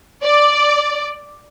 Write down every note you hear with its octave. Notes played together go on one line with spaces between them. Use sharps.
D5